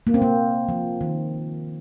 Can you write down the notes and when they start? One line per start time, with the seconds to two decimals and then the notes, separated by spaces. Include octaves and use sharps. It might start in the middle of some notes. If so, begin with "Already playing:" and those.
0.07 A#3
0.14 C4
0.22 A#3
0.69 F3
1.01 D#3